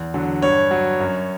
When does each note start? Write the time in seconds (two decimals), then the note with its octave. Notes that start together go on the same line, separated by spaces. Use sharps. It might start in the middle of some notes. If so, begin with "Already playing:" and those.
Already playing: E2
0.14 D3 F#3
0.42 G2 C#5
0.71 F#3
1.00 F#2